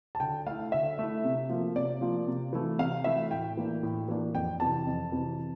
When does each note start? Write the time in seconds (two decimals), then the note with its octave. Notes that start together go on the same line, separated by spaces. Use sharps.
0.15 A5
0.20 D3 G5
0.46 A3 E4 F5
0.72 D3 E5
0.99 A3 E4
1.24 C3
1.49 F3 A#3 F4
1.75 C3 D5
2.01 F3 A#3 F4
2.27 C3
2.53 E3 A3 E4
2.79 C3 F5
3.04 E3 A3 E4 E5
3.31 A2 G5
3.57 E3 A#3 D4
3.83 A2
4.08 E3 A#3 D4
4.34 F2 G5
4.60 C3 E3 A5
4.87 F2
5.12 C3 E3